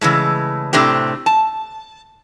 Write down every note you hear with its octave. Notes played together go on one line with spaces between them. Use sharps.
C#3 E3 G#3 A3
A2 C3 A3 C4 D4 G4
A5